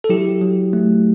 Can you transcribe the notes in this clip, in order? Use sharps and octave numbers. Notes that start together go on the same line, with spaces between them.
A4
F#3 E4 G4
F#3
A3